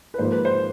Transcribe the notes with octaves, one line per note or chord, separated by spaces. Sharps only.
B4
G#2 F3 A#3 C5
B4
C5